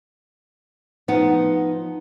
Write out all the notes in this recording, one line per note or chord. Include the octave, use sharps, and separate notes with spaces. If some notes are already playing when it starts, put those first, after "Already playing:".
F3 B3 D#4 F#5